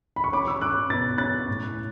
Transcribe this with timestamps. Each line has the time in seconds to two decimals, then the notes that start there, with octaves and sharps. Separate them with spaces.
0.16 B5
0.24 C#6
0.32 C#4 B5 D6
0.47 C#6 E6
0.61 C#4 D6 F#6
0.90 B2 A6
1.18 C#4 F#6 A6
1.48 A2